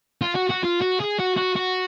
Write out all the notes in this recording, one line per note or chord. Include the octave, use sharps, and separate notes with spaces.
F4
F#4
F#4
F4
F#4
G#4
F#4
F#4
F#4